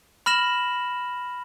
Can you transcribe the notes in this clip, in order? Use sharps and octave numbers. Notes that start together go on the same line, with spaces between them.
B5 F6 A#6 E7 F#7